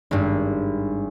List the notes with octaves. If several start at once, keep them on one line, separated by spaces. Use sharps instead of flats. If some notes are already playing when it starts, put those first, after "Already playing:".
G#1 G2